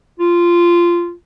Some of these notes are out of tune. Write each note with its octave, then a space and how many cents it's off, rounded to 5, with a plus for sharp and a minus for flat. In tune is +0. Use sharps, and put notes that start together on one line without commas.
F4 -15